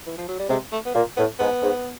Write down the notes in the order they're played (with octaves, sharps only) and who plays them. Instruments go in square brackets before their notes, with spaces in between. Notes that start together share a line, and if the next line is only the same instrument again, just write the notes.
[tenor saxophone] E3
F3
F#3
G3
[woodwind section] C3 [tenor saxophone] G#3
[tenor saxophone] A3
B3
[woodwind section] A#2 [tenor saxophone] A#3
[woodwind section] A2 [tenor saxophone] B3
[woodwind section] G#2 [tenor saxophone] B3
[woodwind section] G#2